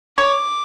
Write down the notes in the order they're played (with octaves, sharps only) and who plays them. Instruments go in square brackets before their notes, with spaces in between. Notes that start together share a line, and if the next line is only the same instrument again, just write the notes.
[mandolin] C#5 [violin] D6